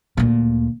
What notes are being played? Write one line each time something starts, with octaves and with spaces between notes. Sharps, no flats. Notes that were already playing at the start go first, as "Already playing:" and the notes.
D2 A#2